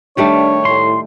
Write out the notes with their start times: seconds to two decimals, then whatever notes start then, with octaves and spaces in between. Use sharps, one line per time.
0.17 D#3 G3 A3 D4 C#5
0.65 A2 C6